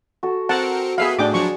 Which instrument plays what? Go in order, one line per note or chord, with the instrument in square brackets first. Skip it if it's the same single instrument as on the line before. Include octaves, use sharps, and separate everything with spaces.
[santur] F#4 A4
[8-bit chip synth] C4 A#4 C#7 [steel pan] F#5 A5
[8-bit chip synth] B3 B4 B5 [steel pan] G#4 E5 F5
[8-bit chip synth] A2 [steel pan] D4 G5 D6 [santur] G#4
[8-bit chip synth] F3 F#3 D4 [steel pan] C#6